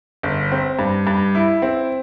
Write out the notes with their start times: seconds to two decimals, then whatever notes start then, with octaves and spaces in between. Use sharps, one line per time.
0.23 G1
0.52 C4
0.79 G2
1.07 G2
1.35 E4
1.62 C4